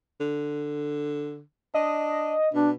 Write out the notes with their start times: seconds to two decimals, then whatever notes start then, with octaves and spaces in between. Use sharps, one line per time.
0.21 D3
1.74 D4 D#5
2.53 B2 D4